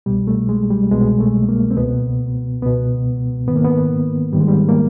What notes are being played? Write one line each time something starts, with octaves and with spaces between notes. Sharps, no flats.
C2 B2 G3
A3
G#3
G3
C2 B2 G#3
A3
A#3
C4
C#2 B2 B3
C#2 B2 B3
G#2 D#3 B3
A#3
B3
G#2 D#3 G3
G#3
G3
A#3